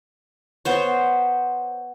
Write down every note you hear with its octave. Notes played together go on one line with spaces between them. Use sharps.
B3 C5 C#5